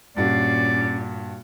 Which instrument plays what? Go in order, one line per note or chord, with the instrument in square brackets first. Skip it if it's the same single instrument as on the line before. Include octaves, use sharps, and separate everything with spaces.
[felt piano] G2 F#4 [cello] A#2 [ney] C#4 [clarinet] D5